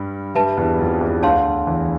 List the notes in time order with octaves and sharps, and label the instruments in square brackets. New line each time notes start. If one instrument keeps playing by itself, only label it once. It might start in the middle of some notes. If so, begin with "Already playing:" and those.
Already playing: [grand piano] G2 G3
[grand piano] G2 G3 [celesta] B4 E5 A5
[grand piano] E2 E3
F2 F3
E2 E3
[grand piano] D2 D3 [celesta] C#5 F5 A5 C6
[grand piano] E2 E3